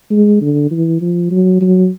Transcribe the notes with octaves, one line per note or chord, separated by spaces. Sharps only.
G#3
D3
E3
F3
F#3
F#3